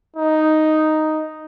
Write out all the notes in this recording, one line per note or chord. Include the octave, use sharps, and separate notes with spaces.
D#4